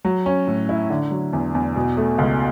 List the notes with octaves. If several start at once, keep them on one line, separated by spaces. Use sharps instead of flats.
F#3
C#4
A2
E4
D3
F#3
E2
E2
B2
A3
C#2